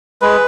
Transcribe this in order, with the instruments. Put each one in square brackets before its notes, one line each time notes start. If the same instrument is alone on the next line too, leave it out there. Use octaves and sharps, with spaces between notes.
[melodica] G#3 B4